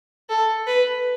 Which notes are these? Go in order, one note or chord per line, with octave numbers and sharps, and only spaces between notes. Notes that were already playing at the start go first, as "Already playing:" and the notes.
A4
B4